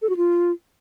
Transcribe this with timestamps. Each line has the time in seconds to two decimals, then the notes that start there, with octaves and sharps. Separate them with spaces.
0.02 A4
0.09 F#4
0.17 F4